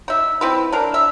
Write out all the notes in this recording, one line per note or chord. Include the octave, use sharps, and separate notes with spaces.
D#4 E5
C4 E4 B4
D4 A#4
E5